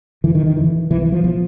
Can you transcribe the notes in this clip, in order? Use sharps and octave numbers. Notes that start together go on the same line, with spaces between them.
F2 D3 E3
D#3
D#3
F2 D3 E3
C2 B2 E3
E3
F3
B2 F3